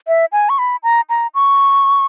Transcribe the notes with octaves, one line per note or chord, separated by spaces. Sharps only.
E5
G#5
C#6
B5
A#5
A#5
C#6